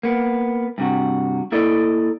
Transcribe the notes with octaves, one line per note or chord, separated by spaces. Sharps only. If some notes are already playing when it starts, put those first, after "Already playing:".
A#3 B3
G2 C3 F#4
A#3 E4 A4 D5 D#5